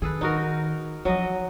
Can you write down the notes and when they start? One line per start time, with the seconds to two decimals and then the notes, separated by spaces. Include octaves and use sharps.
0.02 D#3 G#4 A4 B4
0.21 D#4 F#4 A#4
1.05 F3 F#3 D#5